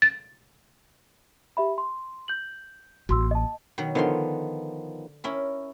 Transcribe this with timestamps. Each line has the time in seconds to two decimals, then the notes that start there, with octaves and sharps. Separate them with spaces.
0.02 A6
1.57 G4 E5 B5
1.78 C6
2.28 G6 F#7
3.09 A1 A#3 F#4 C6 E6
3.31 D#5 A5
3.78 B2 D#3 F#3
3.95 D3 D#3 F3 B3 F5 C6
5.24 C#4 E4 A#4